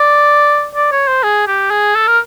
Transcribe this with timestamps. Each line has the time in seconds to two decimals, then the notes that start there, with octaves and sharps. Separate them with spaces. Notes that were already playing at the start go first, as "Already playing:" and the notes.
Already playing: D5
0.76 D5
0.92 C#5
1.08 C5
1.23 G#4
1.47 G4
1.71 G#4
1.95 A4
2.08 A#4